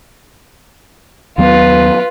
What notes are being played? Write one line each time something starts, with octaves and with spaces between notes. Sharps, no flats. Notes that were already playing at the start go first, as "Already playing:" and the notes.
D#2 F#3 B3 F4 B4